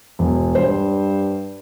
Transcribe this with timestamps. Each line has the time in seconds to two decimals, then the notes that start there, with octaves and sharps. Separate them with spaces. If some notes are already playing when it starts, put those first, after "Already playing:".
0.19 E1
0.55 G2 C5